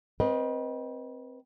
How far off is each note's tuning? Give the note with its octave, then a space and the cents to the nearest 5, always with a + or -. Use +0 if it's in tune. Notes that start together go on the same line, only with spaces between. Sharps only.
C4 +0 B4 -35 D#5 +5